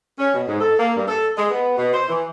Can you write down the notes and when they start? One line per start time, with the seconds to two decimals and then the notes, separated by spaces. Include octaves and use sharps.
0.19 C#4
0.34 B2
0.47 G#2
0.61 A4
0.79 A#3
0.96 G2
1.08 A4
1.36 G#3
1.50 B3
1.77 B2
1.93 C5
2.08 E3